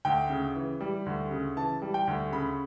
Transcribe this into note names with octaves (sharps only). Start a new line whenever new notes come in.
D2 G5
C#3
E3
G3
D2
C#3
E3 A5
G3
G5
D2
C#3 B5